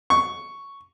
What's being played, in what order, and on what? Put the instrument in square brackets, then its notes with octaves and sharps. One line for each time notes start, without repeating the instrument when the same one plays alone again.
[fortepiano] C#6